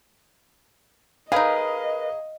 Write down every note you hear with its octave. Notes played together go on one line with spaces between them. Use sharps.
D#4 G#4 A#4 B4 D#5 F5 B5